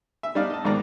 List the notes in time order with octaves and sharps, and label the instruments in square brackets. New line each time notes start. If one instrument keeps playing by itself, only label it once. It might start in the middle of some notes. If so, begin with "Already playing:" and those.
[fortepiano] E5
G3 D4 D#4 D5 F5
D#5 A5
A#1 G#2 D#3 D5 A#5